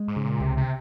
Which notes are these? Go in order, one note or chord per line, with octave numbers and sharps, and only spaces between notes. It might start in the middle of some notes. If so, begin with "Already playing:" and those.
Already playing: G#3
G#2
C#3
A#2
C#2 C3
C3